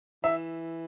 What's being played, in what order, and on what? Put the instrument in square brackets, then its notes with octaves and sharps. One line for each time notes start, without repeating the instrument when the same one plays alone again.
[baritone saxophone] E3 [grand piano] E5